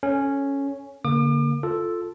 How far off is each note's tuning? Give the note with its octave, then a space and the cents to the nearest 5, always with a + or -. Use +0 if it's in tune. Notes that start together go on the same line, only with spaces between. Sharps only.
C#4 +0 A4 +0
D3 -40 A#3 +0 D6 +40
F4 +0 A4 +0